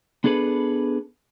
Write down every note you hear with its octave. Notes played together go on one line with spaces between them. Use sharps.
B3 D4 G#4 A4 B4